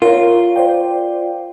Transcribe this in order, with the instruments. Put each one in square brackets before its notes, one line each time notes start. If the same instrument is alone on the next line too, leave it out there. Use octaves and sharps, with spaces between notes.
[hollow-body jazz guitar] F4 [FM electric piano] A#4 C#5
[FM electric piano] C5 D5 G5